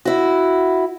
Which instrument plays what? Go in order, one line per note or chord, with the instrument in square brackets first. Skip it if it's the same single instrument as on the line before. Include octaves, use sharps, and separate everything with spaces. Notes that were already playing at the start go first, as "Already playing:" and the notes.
[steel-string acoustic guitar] E4 F#4